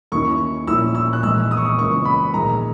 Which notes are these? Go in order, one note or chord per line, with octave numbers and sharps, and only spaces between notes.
D#2 D#3 A#3 C#4 E4 C#6
A#1 A#2 A#3 C#4 E4 E6
E6
F#6
A#1 G#2 E3 E6
D#6
C#6
D#6
C#2 C#3 E3 A#3 C#6
B5
A#1 G#2 D#3 G#3 D#4 A#5